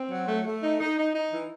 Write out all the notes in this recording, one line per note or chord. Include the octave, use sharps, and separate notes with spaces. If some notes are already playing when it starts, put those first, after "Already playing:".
Already playing: C4
F#3
A3
A3
D#4
D#4
D#4
D#4
E3